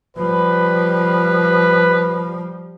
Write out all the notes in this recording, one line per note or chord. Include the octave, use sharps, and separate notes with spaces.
F3 G3 B4